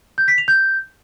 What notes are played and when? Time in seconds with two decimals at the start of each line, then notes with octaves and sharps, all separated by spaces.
0.18 G6
0.28 B6
0.38 F7
0.48 G6